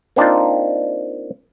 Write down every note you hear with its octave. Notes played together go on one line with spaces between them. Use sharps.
A#3 C4 D4 D#4 F4